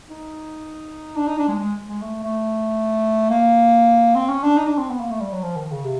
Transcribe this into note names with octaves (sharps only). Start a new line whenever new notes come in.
D#4
D4
D#4
D4
G#3
G#3
G#3
A3
A3
A#3
C4
C#4
D4
D#4
D4
C4
B3
A#3
A3
G3
F#3
F3
D#3
C#3
C3